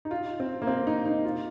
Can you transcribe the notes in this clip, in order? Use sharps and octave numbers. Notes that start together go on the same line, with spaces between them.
D#4
F4
C4
A#3
C4
D#4
D#4
F4